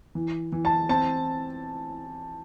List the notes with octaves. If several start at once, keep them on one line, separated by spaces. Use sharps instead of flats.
E3
E3
A5
C4 A5